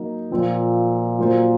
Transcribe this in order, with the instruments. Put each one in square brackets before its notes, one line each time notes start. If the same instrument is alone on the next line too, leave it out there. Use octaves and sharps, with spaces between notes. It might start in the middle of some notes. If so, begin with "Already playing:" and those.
Already playing: [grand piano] F#3 A#3 D#4
[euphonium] A#2 [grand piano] F3 C4 F4
[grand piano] F#3 A#3 F4 C5